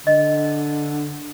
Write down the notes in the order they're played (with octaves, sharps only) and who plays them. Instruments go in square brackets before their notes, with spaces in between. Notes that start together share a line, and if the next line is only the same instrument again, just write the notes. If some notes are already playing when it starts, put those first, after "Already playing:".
[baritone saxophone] D3 [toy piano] D#5